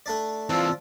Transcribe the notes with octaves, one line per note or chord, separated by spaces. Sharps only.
A3 D4 D5
E3 F3 C4 D4 F4 E6